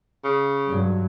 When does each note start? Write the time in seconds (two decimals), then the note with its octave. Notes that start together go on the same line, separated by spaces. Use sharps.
0.24 C#3
0.69 G2 F#3